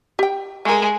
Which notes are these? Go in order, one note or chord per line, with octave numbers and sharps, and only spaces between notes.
G4 G5
G#3 A3 A#4